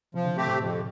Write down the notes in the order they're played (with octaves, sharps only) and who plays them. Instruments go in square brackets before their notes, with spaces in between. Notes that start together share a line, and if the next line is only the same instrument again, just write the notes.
[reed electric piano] C3 [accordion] F3
[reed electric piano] D3
[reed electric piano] C3 [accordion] A3 C4 G4
[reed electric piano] A2
[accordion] F2